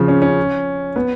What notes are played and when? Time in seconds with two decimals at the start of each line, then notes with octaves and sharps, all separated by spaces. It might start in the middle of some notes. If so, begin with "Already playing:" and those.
Already playing: C#3 F3
0.08 C#4
0.22 C#4
0.96 B3